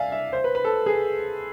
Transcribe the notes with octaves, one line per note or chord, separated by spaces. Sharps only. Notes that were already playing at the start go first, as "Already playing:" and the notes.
Already playing: D5 E5 F5 G#5
E5
C5
B4
B4
A4
G#4